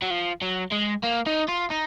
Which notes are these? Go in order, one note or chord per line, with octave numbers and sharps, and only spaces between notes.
F#3
F3
F#3
G#3
A#3
D#4
F4
D#4